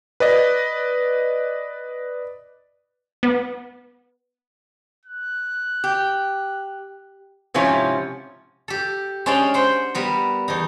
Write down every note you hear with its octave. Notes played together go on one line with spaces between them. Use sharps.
B4 D5 D#5
B3
F#6
G4
G#2 C3 F3 C#4 E4
G4 A4
G#3 C#4 D4 D5 F5 G5
C5 F#5 G5
G3 B3 A#4
E2 D#4